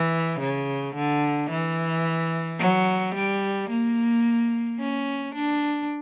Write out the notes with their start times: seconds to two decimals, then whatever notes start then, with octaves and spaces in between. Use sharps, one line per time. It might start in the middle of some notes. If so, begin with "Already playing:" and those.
Already playing: E3
0.40 C#3
0.95 D3
1.50 E3
2.59 F#3
3.15 G3
3.70 A#3
4.79 C#4
5.34 D4